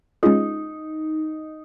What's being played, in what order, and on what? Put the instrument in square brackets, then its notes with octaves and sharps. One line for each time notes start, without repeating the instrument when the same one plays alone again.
[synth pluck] G#3 C#4 F4 G#4 [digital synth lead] D#4